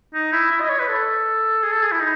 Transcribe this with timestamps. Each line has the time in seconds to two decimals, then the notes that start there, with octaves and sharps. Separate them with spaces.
0.14 D#4
0.32 E4
0.51 E4
0.60 D#5
0.70 C#5
0.79 B4
0.88 A4
1.63 G#4
1.72 A4
1.82 G#4
1.92 E4
2.00 D#4